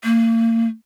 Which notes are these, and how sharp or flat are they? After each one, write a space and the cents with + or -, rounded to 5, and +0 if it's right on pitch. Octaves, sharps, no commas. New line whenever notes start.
A#3 -35